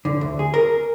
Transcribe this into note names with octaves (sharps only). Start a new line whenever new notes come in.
D3
D2
G#4
A#4